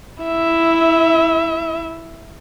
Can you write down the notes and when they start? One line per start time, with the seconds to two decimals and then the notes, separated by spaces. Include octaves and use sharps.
0.23 E4 E5